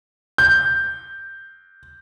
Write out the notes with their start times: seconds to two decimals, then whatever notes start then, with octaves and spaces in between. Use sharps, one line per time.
0.38 G6